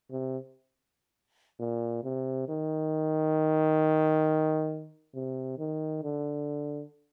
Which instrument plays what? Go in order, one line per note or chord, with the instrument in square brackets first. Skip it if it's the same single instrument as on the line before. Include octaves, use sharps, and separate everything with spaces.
[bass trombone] C3
A#2
C3
D#3
C3
D#3
D3